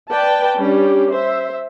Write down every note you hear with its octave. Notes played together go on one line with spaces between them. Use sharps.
B4 D5 G5 A5
G3 C#4 D4 G4
C5 E5